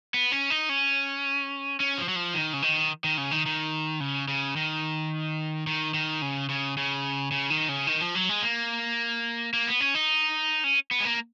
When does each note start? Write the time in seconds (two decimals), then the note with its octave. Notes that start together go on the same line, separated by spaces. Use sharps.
0.14 B3
0.32 C#4
0.50 D#4
0.69 C#4
1.80 C#4
1.98 F3
2.09 F#3
2.16 F3
2.34 D#3
2.53 C#3
2.62 D#3
3.04 D#3
3.18 C#3
3.31 D#3
3.46 D#3
4.00 C#3
4.28 C#3
4.56 D#3
5.67 D#3
5.94 D#3
6.22 C#3
6.49 C#3
6.77 C#3
7.31 C#3
7.50 D#3
7.69 C#3
7.87 D#3
8.01 F3
8.15 F#3
8.29 G#3
8.42 A#3
9.53 A#3
9.67 B3
9.80 C#4
9.95 D#4
10.64 C#4
10.91 B3
11.00 G#3
11.05 A#3